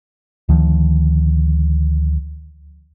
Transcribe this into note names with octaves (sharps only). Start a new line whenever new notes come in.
D2 D#3 F3